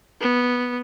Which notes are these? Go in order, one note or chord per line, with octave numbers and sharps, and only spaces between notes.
B3